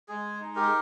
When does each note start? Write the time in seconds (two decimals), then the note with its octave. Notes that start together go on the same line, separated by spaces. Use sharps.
0.08 G#3 G#4
0.40 D#4
0.56 G4 A#4